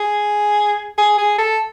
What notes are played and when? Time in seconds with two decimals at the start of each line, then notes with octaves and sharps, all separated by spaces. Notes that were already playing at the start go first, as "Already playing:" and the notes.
Already playing: G#4
0.98 G#4
1.18 G#4
1.38 A4